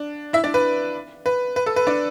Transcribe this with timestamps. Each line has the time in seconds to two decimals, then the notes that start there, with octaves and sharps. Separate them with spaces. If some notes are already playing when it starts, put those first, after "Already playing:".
Already playing: D4
0.33 E4 E5
0.44 D4 D5
0.54 B4
1.26 B4
1.56 B4
1.66 A4
1.76 B4
1.87 D4 D5